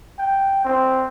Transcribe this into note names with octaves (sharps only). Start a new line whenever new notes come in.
G5
C4